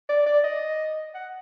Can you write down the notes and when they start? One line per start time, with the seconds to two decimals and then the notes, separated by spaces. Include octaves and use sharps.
0.09 D5
0.26 D5
0.44 D#5
1.15 F#5